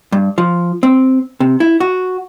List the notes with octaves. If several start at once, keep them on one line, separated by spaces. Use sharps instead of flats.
G2
F3
C4
C3
E4
F#4